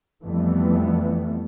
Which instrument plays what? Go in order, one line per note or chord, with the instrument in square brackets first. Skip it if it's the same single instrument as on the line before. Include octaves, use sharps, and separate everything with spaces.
[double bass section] F2 E3 G3 A3 B3